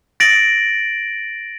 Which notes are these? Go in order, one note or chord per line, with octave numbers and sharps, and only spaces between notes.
A6 A#6 D7 F#7